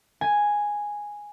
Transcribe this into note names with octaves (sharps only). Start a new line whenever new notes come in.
G#5